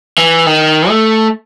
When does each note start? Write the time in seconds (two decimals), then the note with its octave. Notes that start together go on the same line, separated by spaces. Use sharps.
0.18 E3
0.46 D#3
0.89 A3